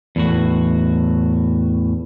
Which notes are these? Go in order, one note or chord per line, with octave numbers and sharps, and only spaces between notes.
E2 A2 F#4